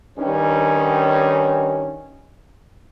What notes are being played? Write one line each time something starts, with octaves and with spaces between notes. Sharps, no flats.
G2 D#3 C#4